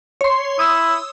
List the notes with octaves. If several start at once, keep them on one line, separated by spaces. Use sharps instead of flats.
C#5 C6
E4 D#6 E6